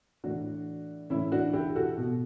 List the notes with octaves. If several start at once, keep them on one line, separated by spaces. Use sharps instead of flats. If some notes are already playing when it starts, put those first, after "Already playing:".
A2 E3 D4 F#4
A2 E3 C#4 E4
D4 F#4
E4 G4
F#4 A4
B2